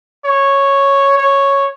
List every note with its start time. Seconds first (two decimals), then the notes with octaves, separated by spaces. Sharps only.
0.25 C#5
1.17 C#5